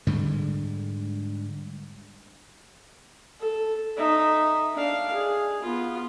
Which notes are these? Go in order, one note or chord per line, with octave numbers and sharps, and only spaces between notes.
G#2 D3 G3 G#3
A4
D#4 E5
D4 F5
G#4
B3 F4